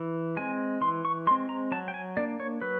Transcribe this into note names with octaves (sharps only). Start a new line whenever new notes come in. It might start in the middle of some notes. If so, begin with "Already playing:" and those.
Already playing: E3
G#3 C4 G#5
E3 C6
C#6
G#3 C4 C6
A#5
F#3 A5
G5
G#5
A#3 D4 D5
C#5
F#3 B4